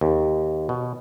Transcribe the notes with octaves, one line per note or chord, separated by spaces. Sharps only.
D#2
B2